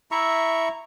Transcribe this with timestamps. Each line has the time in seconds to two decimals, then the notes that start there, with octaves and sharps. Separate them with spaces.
0.11 E4 E5 A#5 C#6